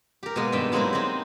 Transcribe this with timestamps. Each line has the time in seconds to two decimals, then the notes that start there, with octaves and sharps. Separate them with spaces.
0.23 G4 A#4
0.36 B2 G#3 A#3
0.52 G2 D#3 B3 E5 G5
0.72 F#3 G#3 A#3 C4 D#4 E4
0.93 C4 D#4 G#4 D#5